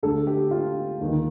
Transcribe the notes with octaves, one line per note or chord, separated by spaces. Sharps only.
D2 D3 A4
G4
F4
D#2 D#3